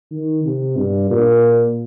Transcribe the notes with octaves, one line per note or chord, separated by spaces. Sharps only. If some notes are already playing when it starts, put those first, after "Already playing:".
D#3
C3
G2
A#2